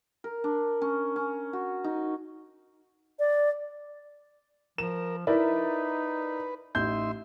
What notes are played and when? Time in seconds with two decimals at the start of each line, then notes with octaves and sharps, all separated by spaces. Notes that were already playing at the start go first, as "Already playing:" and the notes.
0.24 A#4
0.44 D4
0.82 C#4
1.16 C#4
1.53 F#4
1.84 D#4
3.19 D5
4.78 F3 A#4 E7
5.27 D#4 E4 A#4 B4 D5
6.75 A1 D#4 E5 C6 G6